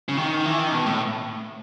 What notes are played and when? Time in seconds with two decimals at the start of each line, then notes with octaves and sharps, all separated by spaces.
0.09 C#3
0.17 D#3
0.46 E3
0.59 D#3
0.72 B2
0.86 A2